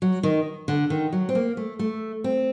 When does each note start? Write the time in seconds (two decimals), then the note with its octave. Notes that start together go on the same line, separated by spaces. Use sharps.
0.02 F#3
0.23 D#3
0.68 D3
0.90 D#3
1.12 F#3
1.29 C4
1.35 A#3
1.57 A3
1.79 A3
2.24 C4